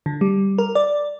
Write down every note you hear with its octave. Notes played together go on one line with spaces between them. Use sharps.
D3
G3
A#4
D5